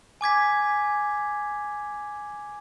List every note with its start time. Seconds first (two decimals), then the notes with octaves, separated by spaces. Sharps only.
0.21 G#5 D6 G#6 B6